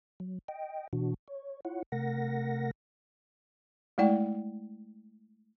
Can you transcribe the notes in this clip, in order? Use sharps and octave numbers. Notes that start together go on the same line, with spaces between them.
F#3
D#5 G5
B2 E3 D4 F#4
C#5
E4 F4 C#5 F#5
C3 A3 A#4 F#5 A#6
G#3 A3 E4 D5 G5